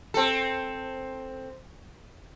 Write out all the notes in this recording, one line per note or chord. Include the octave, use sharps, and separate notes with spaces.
C4 A4